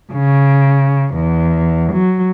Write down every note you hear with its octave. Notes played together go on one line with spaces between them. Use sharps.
C#3
E2
F#3